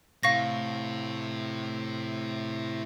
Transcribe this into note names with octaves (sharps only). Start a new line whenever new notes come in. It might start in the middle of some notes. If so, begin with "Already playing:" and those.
A2 C3 F5 C#6 A#6